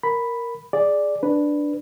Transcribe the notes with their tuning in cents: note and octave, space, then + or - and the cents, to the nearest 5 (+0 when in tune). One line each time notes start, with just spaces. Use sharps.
A#4 +0 B5 +0
G#4 +0 D5 +0
D4 +0 B4 +0